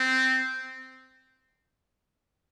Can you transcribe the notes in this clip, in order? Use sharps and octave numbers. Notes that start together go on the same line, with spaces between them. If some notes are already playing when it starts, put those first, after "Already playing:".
Already playing: C4